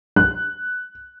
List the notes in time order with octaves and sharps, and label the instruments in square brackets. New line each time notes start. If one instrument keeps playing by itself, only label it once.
[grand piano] F#6